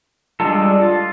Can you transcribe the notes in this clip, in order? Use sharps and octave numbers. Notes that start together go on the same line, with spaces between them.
G3 G#3 D4 F4 A4
F4